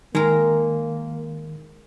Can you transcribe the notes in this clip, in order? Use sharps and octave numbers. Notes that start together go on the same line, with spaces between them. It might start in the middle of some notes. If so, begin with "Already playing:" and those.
D#3 G#3 A#3 A#4